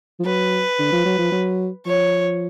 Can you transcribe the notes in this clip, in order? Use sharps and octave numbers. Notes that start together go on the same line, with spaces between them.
F3
F#3 B4
D3
F3
F#3
F3
F#3
F3 C#5